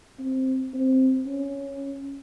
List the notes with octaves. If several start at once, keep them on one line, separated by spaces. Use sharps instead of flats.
C4
C4
C#4